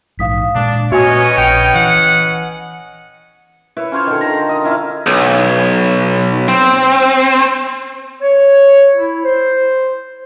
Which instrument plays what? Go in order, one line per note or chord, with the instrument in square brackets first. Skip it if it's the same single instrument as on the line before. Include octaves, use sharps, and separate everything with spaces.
[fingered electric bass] A#1 G#2 E3 [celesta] F5 D#6 B6
[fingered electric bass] A#2 G#3 [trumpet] D4
[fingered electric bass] A#2 [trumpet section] B3 C#4 D#5 [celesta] F#4 G#5 [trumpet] C#5
[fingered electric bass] A#1 [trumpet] G5 [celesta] C#7 F7
[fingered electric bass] E3 [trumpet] F#5
[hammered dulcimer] E4 B4 C#5
C#4 F4 C5 C#5
D3 D#3
A#5
D#5
C#4 E4 F5
[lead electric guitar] B1
C4
[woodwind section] C#5
E4
C5